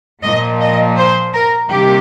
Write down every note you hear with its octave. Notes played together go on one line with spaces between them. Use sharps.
A#2 F3 A#3 D#5
D#5
C5
A#4
C3 D#3 G3 A#3 G4